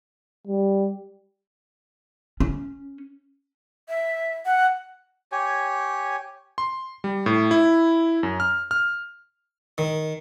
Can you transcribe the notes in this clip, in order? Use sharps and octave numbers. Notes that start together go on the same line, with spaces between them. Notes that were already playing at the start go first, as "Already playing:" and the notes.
G3
C#4
E5
F#5
G4 C#5 G#5
C6
G3
A2
E4
F#2
F6
F6
D#3